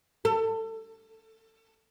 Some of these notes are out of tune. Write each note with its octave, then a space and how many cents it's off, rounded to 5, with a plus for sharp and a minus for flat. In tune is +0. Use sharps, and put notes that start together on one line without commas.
A4 +25